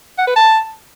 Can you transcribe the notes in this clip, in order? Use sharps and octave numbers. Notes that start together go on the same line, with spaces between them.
F#5
B4
A5